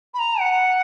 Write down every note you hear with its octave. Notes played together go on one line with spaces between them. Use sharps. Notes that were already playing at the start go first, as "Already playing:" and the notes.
B5
A#5
F#5